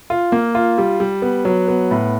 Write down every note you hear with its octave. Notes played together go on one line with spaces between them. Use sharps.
F4
A#3
F4
G3
G3
B3
F#3
B3
A2